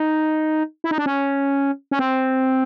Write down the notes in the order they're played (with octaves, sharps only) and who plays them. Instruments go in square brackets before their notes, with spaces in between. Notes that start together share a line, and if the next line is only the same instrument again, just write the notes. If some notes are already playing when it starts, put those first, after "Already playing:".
Already playing: [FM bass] D#4
E4
D#4
D4
C#4
C#4
C4